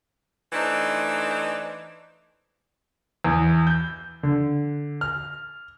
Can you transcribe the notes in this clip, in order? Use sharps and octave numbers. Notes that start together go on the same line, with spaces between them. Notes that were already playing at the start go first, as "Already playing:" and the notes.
E3 A3 D4 D#4 C5
E2
G6
D3
F6